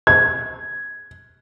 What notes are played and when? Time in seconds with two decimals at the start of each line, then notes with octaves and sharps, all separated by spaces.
0.07 G#6